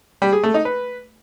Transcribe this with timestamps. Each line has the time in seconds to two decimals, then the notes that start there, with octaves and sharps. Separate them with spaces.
0.22 G3
0.33 G#4
0.43 A3
0.54 D#4
0.65 B4